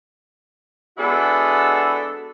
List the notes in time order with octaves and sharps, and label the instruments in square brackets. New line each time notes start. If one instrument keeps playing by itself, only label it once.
[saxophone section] G#3 B3 D4 E4 F#4 A4